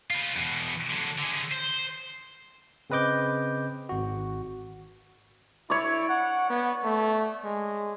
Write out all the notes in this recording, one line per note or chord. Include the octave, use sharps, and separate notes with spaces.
F4 B4
E2 B2
D3 F#3
D3 G#4
C5
C#3 C4 B4 D#5 D6 G6
G#1 F#4
E4 C#5 D5
F#5
B3
A3
G#3